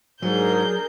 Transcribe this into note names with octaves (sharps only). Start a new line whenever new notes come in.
G#2 F#3 D4 G#4 A#4 G6